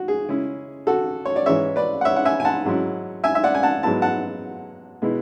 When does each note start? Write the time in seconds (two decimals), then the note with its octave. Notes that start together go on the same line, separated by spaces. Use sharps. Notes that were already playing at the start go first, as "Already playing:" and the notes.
Already playing: F#4
0.08 G#4
0.29 C#3 G#3 C#4 E4
0.87 F#4 A4
1.25 C#5
1.36 D5
1.46 G#2 E3 G#3 C#4 C#5 E5
1.76 B4 D5
2.01 F#5
2.05 C#5 E5
2.16 F#5
2.25 E5 G#5
2.40 G#5
2.45 F#5 A5
2.65 G#2 F#3 C#4 E4
3.24 E5 G#5
3.35 E5
3.43 D5 F#5
3.55 G#5
3.63 F#5 A5
3.83 G#2 F#3 B3 E4 A5
4.02 F#5 A5
5.02 B2 G#3 B3 E4